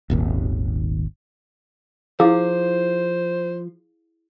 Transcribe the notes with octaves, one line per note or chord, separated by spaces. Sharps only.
D#1 G#1 D#2
F3 E4 G#4 C5 F5